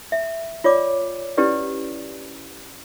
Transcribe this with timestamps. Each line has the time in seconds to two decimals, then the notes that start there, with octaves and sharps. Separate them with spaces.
0.12 E5
0.64 F4 C#5 D5 D6
1.37 C#4 E4 G4 B4 D5